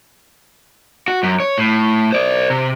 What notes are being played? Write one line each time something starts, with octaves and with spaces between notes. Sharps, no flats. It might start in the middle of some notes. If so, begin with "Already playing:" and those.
F#4
F#2
C#5
A2
C5 D5
C3